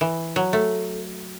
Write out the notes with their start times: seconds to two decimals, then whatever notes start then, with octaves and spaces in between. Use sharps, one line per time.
0.01 E3
0.36 F#3
0.53 A3